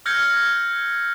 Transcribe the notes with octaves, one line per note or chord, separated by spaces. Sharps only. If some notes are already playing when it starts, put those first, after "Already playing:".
E6 F6 G6 G#6 A#6 C#7